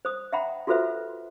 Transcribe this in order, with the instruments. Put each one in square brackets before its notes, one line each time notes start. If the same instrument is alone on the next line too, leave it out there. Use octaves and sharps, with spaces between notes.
[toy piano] C5 D#6
E5 F#5 G5 A#5 B5
F4 F#4 A4 B4 C5 E5